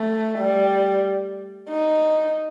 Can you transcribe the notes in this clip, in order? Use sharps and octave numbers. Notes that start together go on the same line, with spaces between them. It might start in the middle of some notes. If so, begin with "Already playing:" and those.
Already playing: A3
G3
D#4